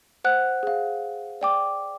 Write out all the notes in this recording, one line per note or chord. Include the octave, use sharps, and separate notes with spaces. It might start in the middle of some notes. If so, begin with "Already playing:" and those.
C5 F#5 F#6
G#4 F5
D5 G5 D6